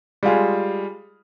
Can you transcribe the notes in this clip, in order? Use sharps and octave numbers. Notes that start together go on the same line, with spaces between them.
G3 G#3 F4 G#4